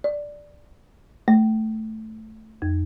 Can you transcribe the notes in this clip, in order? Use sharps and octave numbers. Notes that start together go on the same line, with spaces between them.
D5
A3
F2